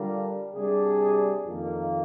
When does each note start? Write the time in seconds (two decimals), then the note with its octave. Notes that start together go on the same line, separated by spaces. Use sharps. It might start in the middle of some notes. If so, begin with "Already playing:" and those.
Already playing: D3 G3 D4 F4 A#4
0.55 C3 G3 D4 G#4
1.47 F2 D#3 A#3